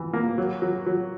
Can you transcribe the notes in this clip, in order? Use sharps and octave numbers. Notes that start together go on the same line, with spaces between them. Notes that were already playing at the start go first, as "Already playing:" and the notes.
Already playing: E3
A#3
F#3
F#3
F#3